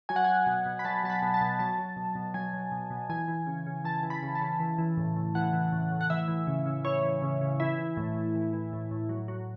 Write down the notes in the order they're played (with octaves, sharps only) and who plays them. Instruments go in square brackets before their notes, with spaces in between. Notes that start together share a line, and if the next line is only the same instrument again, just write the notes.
[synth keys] F#3 G#5
F#5
F#3 G#5
B2
B2
B5
F#3 A5
F#3 A5
B5
B2
A5
B2
F#3 A5
F#3
B2
B2
F#3 G#5
F#3
B2
B2
E3 G#5
E3
C#3
C#3
E3 A5
E3
B5
C#3
A5
C#3
E3
E3
A2
A2
E3 F#5
E3
A2
A2
F#5
E3 E5
E3
C#3
C#3
E3 C#5
E3
C#3
C#3
E3 E4
E3
A2
A2
E3
E3
A2
A2
F#3
F#3